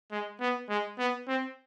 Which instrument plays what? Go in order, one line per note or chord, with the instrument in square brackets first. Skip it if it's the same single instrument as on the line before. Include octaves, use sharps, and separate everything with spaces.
[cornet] G#3
B3
G#3
B3
C4